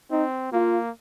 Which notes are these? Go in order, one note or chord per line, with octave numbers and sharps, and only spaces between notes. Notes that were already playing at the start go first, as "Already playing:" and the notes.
C4 D#4
A#3 F4